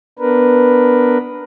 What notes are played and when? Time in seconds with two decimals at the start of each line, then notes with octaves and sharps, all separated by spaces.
0.19 B3 D4 A#4 B4